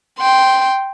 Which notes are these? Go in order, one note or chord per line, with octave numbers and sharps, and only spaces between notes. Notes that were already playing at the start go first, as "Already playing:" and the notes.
G5 C6